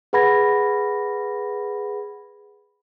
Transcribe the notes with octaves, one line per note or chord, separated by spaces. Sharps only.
G#4 B4 F#5 B5 G#6 A#6